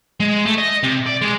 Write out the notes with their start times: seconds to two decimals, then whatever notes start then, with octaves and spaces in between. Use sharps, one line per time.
0.20 G#3
0.45 A3
0.58 D#5
0.83 C3
1.06 D5
1.22 G#3